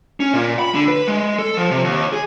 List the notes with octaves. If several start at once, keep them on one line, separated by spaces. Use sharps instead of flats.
C#4
A#2
B5
D3
B4
G#3
A4
F3
C3
D#2
G#4